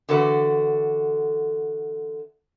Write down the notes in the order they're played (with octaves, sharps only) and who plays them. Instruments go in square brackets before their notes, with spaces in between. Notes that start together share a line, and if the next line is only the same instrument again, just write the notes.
[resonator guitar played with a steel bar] D3 E3 F#4 A4 B4